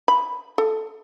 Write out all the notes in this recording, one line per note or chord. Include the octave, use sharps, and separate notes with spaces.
B5
A4